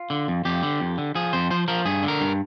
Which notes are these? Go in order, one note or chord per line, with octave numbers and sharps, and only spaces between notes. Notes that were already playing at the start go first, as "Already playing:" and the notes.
Already playing: F4
D3
F2
F2 G4
D3
F2
D3
F3 G#4
F2 C5
F3 C5
F3 A#4
G2 G#4
D3
A#4
G2